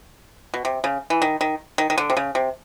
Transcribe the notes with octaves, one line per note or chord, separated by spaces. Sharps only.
B2
C3
C#3
E3
D#3
D#3
D#3
D#3
D3
C3
C#3
C3